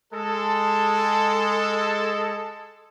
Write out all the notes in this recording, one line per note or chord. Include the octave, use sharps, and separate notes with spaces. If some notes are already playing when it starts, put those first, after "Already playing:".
G#3 A4